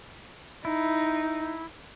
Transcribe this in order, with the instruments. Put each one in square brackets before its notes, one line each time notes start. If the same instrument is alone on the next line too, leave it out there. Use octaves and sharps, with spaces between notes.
[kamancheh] D#4 [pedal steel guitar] E4